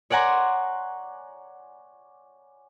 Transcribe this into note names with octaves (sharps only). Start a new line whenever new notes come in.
C#5 D5 F#5 G#5 A#5 C6